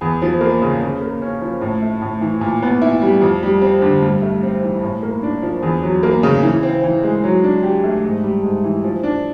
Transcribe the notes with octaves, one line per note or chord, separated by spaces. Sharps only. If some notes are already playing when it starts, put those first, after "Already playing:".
E2
F3
A#3
C#3
C#3
A#3
C#4
F3
A2
A3
A2
E3
A#2
B3
E4
G3
F2
G3
C4
D3
G2
A3
C4
E3
A2
A#3
D4
F3
E2
F#3
A#3
C#3
E3
C4
E3
G#3
F#3
D4
G4
A3
G#2
G3
G#2
E3
F3
D4